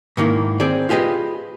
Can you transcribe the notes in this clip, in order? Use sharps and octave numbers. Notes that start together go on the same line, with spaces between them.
G#2 D#3 A#3 E4
C4 G#4 D5
F4 G4 G#4 B4 D#5